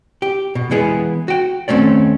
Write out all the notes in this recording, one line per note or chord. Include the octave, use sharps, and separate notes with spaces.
G4
B2
E3 G#3 B3 E4 G#4
F#4 G5
D#2 A3 C4 C#4 D5